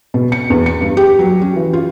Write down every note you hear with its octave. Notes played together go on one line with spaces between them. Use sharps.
B2
C#7
E2
C#7
G2
G4
F#3
C#4
E3
F4